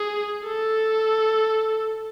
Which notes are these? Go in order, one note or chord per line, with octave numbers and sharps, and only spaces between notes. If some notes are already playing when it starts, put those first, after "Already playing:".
Already playing: G#4
A4